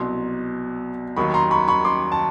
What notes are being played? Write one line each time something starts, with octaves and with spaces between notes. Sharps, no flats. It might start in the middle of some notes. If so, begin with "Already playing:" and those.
Already playing: C2 B2 F#3 C6
D#2 D#3 F#3 B5 C#6
A#5 C6
B5 C#6
B5 C#6
C6 D6
A5